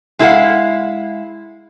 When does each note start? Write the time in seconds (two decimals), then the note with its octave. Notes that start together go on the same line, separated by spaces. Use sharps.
0.19 G#3 E4 G4 A4 F5 F#5